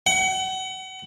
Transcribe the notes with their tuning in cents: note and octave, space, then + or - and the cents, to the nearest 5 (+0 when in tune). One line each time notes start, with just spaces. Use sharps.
F#5 +35